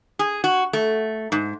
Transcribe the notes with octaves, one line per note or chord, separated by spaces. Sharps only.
G#4
F#4
A3
G#2